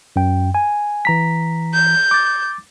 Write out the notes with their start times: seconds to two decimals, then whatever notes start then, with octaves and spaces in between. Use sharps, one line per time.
0.16 F#2 G5
0.55 G#5
1.05 E3 A#5 B6
1.73 G6
2.11 D6 A6